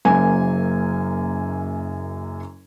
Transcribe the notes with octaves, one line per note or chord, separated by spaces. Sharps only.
F#1 F#2 A#3 G#5 G#6